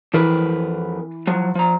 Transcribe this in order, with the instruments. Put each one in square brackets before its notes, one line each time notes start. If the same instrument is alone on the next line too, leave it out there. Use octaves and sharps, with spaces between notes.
[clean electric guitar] F2 A#4 B4 [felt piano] E3
[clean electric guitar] F3 F#3
F3 A#5